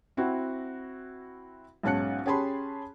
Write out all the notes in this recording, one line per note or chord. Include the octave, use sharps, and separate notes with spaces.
C4 E4 F#4
B1 G#2 C#4 A5 F#6 C#7
C#4 G4 G#4 A5 B5 C6